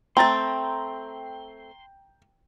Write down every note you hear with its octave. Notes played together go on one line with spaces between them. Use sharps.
A3 C4 G5 A#5 C6 A6